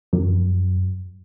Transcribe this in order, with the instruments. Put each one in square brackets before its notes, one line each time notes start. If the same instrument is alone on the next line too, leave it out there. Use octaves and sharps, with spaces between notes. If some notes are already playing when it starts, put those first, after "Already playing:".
[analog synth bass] F#2